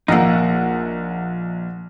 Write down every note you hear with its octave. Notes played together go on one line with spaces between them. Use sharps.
A#1 A#3 D#4 F#5 E6